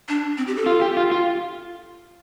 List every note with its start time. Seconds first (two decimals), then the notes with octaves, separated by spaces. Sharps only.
0.09 D4
0.38 C4
0.47 G4
0.57 A4
0.66 F4
0.82 G4
0.97 F4
1.11 F4